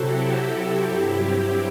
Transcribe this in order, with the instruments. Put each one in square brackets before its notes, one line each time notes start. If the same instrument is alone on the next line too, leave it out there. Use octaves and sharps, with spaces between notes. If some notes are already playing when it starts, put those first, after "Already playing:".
Already playing: [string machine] C3 F#3 C4 E4 F#4 G4 A4
G2 F#3 C4